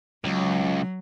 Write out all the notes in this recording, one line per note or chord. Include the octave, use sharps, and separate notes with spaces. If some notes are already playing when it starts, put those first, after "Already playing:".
C#2 F#3